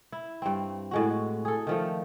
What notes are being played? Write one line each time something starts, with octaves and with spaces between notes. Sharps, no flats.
E4
G2 C4
A2 G#3 F#4
G#4 A4
D#3 F3 A3